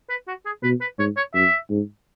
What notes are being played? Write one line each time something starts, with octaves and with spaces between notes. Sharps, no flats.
B4
F#4
G#4
B2 B4
B4
G#2 C#5
C#5
F#2 E5
G#2